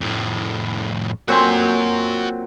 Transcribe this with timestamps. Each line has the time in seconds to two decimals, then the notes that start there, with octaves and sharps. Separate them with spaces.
0.01 F2 A2
1.28 A#2 F#3 C4 F#4 G#5